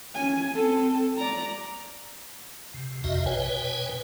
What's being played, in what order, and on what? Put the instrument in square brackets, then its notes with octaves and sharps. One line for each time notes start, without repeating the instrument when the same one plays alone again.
[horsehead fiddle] C#4 G#5
C4 A4
D5 A#5
[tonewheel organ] C3
A#1 F2 C3 F#4 D#5 E5
B2 B4 C#5 G5 G#5